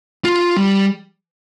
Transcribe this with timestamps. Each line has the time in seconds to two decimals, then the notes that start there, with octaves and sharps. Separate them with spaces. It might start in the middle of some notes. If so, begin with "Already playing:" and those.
0.25 F4
0.56 G3